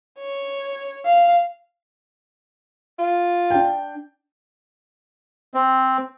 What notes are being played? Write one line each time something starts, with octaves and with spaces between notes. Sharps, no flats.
C#5
F5
F4
D4 G5
C4